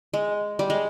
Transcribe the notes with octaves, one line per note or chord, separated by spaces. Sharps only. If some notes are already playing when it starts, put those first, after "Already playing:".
G#3
G3
G#3